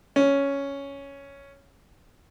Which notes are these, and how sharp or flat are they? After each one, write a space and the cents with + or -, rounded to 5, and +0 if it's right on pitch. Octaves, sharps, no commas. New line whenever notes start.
C#4 +5